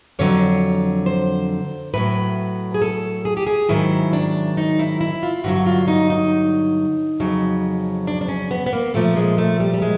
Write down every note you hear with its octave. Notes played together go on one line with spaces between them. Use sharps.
F2 D3 F#3 C#5
C5
A2 F#3 B4
G#4
A4
G#4
G4
G#4
G#2 D#3 F#3 E4
D4
D#4
E4
E4
F4
G2 D3 F#3 F#4
F4
D#4
D#4
F2 C#3 F#3
D4
D4
C#4
B3
B3
A#3
A#2 F3 A3
G#3
A3
G3
G3
G#3